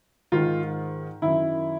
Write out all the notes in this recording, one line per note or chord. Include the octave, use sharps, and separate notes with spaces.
G#2 D#3 F4
F#2 D#3 E4